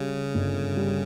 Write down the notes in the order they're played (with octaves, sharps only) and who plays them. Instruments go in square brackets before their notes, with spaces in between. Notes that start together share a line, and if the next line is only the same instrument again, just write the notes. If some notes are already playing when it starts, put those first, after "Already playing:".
Already playing: [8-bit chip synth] C#3 [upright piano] G3
[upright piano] G1
G3